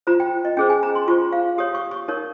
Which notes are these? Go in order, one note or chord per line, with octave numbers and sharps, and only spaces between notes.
F4 C5 A#5
G5
D#5
C#4 G#4 C5 G5
G#5
A#5
C6
F4 C5 C#6
F5
G4 C#5 D#6
C#6
C#6
D#4 A#4 C#5